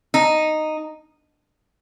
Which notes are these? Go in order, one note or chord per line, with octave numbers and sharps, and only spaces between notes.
D#4